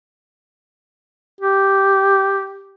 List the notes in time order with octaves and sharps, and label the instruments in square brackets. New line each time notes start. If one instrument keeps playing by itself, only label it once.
[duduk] G4